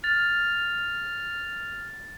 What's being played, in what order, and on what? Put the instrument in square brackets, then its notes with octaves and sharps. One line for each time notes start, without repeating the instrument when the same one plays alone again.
[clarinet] F6 [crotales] A6